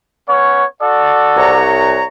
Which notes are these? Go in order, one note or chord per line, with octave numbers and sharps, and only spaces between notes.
B3 C#4 C#5
F#4 A4 D5
C2 C#5 A#5